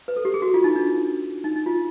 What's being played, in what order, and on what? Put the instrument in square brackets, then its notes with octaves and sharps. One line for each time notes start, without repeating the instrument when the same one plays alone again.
[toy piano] B4
A4
G4
G#4
F#4
F4
D#4
D4
D#4
D#4
F4